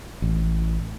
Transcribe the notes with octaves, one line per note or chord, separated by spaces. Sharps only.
A1